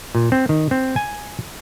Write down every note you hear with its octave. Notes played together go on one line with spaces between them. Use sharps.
A#2
C4
D#3
C4
G#5